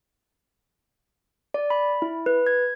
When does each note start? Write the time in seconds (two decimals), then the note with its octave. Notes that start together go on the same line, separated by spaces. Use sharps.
1.54 D5
1.70 B5
2.02 E4
2.26 B4
2.47 G#6